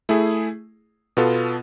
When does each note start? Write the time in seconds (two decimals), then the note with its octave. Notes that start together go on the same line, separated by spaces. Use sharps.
0.09 A3 E4 G#4
1.17 B2 B3 F4 A4